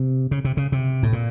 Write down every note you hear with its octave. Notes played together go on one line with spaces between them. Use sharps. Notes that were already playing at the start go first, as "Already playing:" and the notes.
Already playing: C3
C#3
C3
C#3
C3
A2
A#2